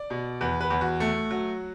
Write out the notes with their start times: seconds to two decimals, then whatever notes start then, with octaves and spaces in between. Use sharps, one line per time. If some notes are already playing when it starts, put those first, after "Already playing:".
Already playing: D5
0.10 B2
0.41 E2 B4
0.61 B4
0.70 E2
0.81 F#4
1.00 A3
1.31 F#3